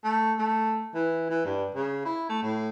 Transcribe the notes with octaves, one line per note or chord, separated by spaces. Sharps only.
A3
A3
E3
E3
G2
C#3
E4
A3
A2